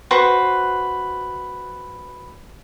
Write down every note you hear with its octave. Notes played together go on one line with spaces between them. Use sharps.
F#4 B4 C5 C#6